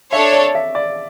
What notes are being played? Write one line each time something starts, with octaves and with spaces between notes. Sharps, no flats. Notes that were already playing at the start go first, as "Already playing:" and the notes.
D4 A4 C#5 E5
D5
E5
D5